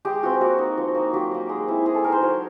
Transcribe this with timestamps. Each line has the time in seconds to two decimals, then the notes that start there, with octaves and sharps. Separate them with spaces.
0.05 G#3 G4
0.23 C4 F4 F#4
0.41 A#3 F#4
0.58 D#4
0.78 F3
0.95 A#3 D#4
1.13 F#3 G4
1.31 A#3 D#4
1.49 G#3
1.67 C4 E4
1.86 G#3 G#4
1.95 A4
2.04 C4 D#4 A#4
2.12 C5
2.21 F#3 C#5